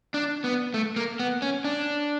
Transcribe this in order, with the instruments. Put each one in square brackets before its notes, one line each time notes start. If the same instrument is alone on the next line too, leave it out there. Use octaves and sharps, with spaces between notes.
[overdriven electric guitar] D4
B3
A3
A#3
B3
C#4
D4